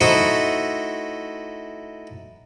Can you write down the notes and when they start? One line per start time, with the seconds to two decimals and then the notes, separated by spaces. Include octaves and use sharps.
0.01 A3 D#4 E4 F#4 C5 D#5